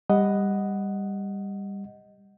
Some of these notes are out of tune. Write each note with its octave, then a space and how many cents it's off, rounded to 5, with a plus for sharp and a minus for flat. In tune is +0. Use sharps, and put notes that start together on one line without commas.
G3 +20 D#5 +0 F#5 +0